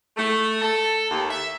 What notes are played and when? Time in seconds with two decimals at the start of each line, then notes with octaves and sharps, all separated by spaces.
0.17 A3
0.62 A4
1.11 D#2
1.30 E5